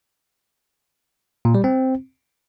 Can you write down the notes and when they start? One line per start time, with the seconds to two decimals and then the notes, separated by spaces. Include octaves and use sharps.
1.45 A#2
1.55 G3
1.64 C4